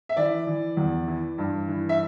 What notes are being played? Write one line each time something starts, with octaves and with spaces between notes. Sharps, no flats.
E5
E3 D5
E3
E2
E3
G2
E3
E5